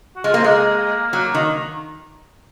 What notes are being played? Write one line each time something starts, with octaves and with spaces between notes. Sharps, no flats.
F#4
G#3 F4
A#3 C4
G#3 A#3
F#3
D#3